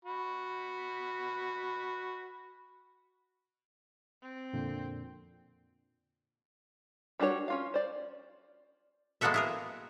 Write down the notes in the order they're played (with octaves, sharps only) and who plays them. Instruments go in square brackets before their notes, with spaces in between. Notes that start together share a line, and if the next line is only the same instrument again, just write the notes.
[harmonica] F#4 B5
[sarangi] C4
[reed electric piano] F2 A#2 D3
[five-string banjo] G3 D4 F#4 G#4 C#5
C#4 F4 F5
C5 D5
[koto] G#3 A#3 B3 F#4 A4 E5
E4 G#4 A#4